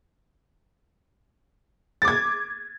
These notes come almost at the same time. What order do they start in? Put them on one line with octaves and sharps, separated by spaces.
A6 D6 G#6